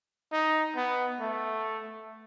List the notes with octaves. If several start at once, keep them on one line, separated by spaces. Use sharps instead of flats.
D#4
B3
A3